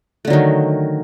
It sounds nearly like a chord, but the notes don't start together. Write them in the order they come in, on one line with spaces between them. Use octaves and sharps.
A3 D3 F#3 D#3